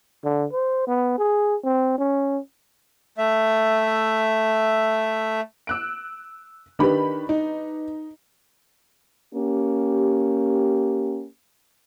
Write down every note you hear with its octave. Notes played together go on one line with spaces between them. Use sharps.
D3
C5
B3
G#4
C4
C#4
A3 E5
E6 F#6 D7
D#3 D4 G4 B4 B5
D#4
A#3 C#4 G4